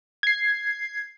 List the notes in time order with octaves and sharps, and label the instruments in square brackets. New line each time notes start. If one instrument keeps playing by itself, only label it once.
[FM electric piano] G#6 C7